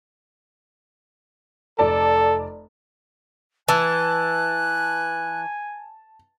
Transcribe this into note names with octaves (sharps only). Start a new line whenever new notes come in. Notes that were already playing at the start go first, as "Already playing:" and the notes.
F1 A4 D5 A5
E3 G#5 A5 F#6